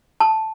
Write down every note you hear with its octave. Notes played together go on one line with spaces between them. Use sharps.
A5